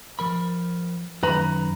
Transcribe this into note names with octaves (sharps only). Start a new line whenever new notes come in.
F3 A#4 B5
F#2 D#3 B4 A#5 B5